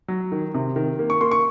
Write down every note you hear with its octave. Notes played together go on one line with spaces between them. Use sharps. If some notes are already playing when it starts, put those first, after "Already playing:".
F#3
D#3
C3
D#3
A#3
C#6
A#3 C6
C#6